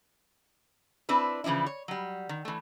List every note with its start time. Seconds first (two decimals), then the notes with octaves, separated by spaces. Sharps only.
1.09 C4 D4 E4 B4
1.44 C#3 E3 F3 D4 E4
1.66 C#5
1.88 F#3 G3
2.29 D#3
2.45 E3 A3